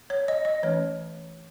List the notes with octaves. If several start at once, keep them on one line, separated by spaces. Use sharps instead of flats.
C#5
D#5
D#5
E3 A3 C#4 C#5